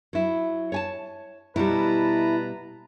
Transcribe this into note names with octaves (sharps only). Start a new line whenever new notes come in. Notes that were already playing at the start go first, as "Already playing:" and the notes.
F#3 E4
C#5 G#5 A5
B2 G3 D#4 E4 B4 A5 A#5